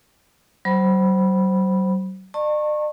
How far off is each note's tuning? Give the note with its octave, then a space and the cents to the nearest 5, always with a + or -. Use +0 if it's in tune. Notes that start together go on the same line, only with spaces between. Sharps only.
F#3 +40 C5 +0 B5 -10
D5 +45 A5 +35 C#6 -25